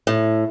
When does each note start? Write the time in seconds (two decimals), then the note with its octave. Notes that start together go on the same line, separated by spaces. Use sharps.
0.07 A2